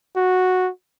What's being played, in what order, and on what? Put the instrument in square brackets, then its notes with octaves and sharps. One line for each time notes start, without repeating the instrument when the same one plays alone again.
[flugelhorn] F#4